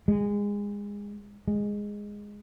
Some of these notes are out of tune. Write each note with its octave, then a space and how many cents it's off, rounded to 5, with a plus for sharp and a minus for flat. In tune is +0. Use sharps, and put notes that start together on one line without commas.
G#3 -25
G#3 -10